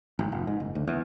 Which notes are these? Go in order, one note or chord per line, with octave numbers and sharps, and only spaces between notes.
G#1
F1
G#2
F#1
D2
E2